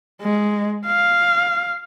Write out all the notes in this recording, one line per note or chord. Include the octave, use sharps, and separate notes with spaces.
G#3
F5